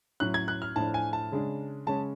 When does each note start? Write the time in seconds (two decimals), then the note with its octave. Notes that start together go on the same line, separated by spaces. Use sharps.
0.20 A2 F#3 C#4 F#6
0.34 G#6
0.48 F#6
0.62 F6
0.76 A2 F3 A3 D4 A5
0.94 G#5
1.13 A5
1.32 C#3 G#3 D4
1.86 C#3 G#3 C#4 A5